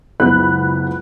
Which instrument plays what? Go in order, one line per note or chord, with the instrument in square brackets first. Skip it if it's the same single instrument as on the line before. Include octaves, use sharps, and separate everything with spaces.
[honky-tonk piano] F#1 C#2 B3 B5 F#6